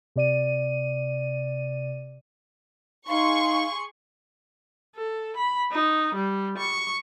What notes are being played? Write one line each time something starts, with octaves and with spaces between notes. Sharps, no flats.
C3 D5 D#7
D#4 G#4 F5 C6 C#6
A4
B5
D#4
G3
C#6